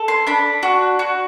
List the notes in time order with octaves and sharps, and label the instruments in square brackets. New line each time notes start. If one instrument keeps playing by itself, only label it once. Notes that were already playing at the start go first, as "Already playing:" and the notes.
Already playing: [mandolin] A4
C6
D4 B5
F#4
F#4